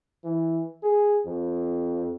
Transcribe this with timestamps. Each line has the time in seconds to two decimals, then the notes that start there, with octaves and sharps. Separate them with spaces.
0.24 E3
0.83 G#4
1.26 F2